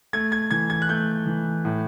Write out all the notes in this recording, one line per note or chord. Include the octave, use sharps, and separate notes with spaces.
A3 G#6
G#6
E3 G#6
G#6
F#6
A3 G6
E3
A2